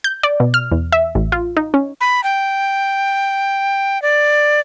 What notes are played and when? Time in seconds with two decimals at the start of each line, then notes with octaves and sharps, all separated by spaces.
0.04 G6
0.23 D5
0.40 B2
0.54 F6
0.72 E2
0.92 E5
1.15 A1
1.32 F4
1.57 D#4
1.74 C#4
2.01 B5
2.24 G5
4.02 D5